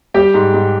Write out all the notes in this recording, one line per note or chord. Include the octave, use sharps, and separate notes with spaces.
G3 G4 G5
G#2
G#2